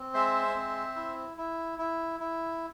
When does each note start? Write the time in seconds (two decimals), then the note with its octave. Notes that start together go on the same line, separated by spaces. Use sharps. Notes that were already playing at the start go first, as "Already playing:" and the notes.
Already playing: C4
0.14 G#3 C5 E5
0.55 C4
0.96 E4
1.37 E4
1.79 E4
2.20 E4